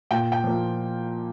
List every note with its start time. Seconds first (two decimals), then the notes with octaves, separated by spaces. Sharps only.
0.11 A#2 G5
0.32 G5
0.44 F3 A#3